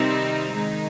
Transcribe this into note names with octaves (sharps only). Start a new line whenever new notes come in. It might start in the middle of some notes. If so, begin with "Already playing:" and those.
Already playing: C3 D#3 G3 C4 D#4
D#3 G#3 D#4